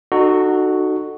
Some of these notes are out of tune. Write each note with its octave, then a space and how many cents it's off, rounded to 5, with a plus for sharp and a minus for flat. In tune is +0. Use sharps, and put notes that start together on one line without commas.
D#4 -35 F#4 +0 A4 +0